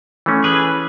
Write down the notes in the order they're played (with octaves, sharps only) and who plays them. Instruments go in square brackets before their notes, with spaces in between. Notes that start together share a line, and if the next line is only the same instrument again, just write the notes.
[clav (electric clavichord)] E3 A3 C#4
[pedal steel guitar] G#4 B4